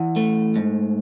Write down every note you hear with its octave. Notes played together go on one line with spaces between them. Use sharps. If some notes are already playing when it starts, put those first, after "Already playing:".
Already playing: E3 F#5
A3
G#2